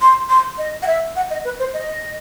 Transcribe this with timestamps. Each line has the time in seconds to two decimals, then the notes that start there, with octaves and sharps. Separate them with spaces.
0.01 C6
0.30 C6
0.58 D#5
0.82 F#5
0.87 E5
1.16 F#5
1.31 D#5
1.45 B4
1.59 C5
1.74 D#5